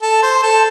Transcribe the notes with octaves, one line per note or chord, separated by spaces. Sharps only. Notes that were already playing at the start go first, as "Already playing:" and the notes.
A4
C5
A4